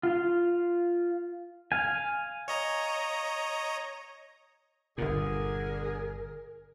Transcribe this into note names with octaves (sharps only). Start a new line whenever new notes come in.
F4 F5
F5 G#5
C#5 D#5 A#5
G1 A#2 D3 G#4 A#4